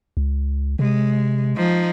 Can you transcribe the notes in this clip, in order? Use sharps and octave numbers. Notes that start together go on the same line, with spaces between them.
C#2
C3 G#3
F3 D#4